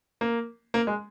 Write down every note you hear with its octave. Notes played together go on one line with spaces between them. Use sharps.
A#3
A#3
G#3